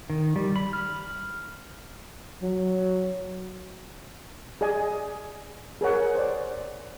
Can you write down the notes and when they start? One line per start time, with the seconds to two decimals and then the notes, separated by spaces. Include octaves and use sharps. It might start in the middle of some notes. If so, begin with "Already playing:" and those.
0.10 D#3
0.36 G3
0.56 B5
0.73 F6
2.42 F#3
4.61 G#4 D5 D#5 G#5
5.81 G#4 A#4 C#5 F#5
6.15 C5 D5